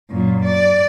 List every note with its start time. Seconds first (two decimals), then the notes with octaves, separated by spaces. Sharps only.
0.10 F#2 A#2
0.45 D5